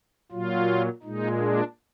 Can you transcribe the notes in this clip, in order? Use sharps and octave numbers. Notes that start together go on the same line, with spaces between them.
A#2 F#3 F4
A#2 G#3 D#4
D4